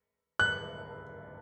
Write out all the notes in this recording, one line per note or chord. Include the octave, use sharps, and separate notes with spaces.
F#6